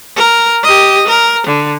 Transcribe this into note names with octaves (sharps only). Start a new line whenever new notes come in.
A#4
G4 D#5
A#4
D3